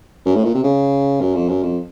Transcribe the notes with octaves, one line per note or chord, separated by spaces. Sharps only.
F#2
A2
A#2
C3
C#3
F#2
F2
F#2
F2